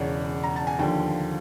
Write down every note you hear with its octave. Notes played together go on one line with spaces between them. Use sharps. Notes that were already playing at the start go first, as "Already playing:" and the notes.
Already playing: E1 E2 C#3 C#5 D5
A#5
A5
G#5
D#2 D3 F3 G5